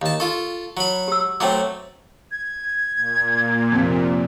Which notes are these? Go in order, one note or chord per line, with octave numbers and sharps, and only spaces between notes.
D#2 A5
F4 A4 C#6
F#3 B5
G4 E6
F#3 A3 C4 C#5 G5 D6
G#6
A#2
F2 C3